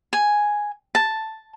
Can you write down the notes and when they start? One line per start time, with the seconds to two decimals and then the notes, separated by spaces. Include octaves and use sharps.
0.13 G#5
0.95 A5